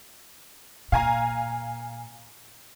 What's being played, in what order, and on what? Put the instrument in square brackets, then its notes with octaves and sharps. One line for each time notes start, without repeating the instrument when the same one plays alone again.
[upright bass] A#2 [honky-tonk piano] F5 G#5 A#5